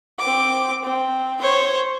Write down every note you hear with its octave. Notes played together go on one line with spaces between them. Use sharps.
C4 D6
C4
C5 C#5